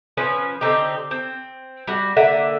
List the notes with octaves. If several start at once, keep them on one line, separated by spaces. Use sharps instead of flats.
F3 C#4 B4
D3 C4 D#4 G4
C4
G3 F#4 F#5
D3 A#3 E5 F#5